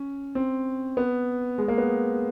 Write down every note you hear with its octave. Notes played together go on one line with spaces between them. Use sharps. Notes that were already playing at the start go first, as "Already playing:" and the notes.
Already playing: C#4
C4
B3
G#3
A#3
B3